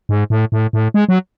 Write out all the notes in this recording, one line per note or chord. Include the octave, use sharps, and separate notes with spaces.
G#2
A2
A2
A2
G#3
F#3